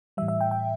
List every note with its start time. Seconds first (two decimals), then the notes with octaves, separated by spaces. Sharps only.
0.17 A2 E3 G3 E5
0.28 E5
0.41 G5
0.51 G5